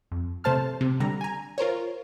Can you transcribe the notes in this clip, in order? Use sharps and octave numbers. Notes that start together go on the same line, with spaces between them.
F2
C3 A3 C5 A5 F6
C3
D3 G3 A#5
G#5 A#5
F4 A#4 C5 C#5